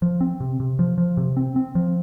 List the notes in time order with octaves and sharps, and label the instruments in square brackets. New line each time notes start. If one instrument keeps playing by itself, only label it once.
[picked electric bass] F3
C4
C3
C3
F3
F3
C3
C4
C4
F3